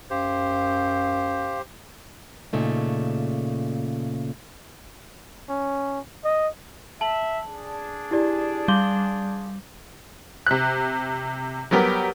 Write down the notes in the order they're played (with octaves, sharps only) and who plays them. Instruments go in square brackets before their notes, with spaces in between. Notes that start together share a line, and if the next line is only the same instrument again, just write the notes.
[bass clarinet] F#2 [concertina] G4 C5 [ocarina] F5
[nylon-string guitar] A#2 C#3 A3 D#4
[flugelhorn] C#4
D#5
[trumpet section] E5 [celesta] A5 F#7
[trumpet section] D4 G#4
[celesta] E4 G4 D5
[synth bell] G3 [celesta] F5 C6 G7
[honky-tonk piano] C3 F#6
F#3 G3 B3 G4 A#4